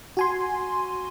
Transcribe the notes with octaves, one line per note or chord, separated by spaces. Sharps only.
F#4 G#5 C6